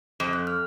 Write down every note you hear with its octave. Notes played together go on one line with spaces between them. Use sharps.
F2
F#6
F6